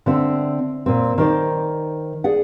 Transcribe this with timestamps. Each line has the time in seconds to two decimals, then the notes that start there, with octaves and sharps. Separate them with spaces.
0.06 D3 C4 E5
0.86 A#2 C4
1.18 D#3 C5 D5
2.24 G#4 D5 F#5